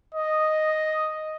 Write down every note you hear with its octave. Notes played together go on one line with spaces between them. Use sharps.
D#5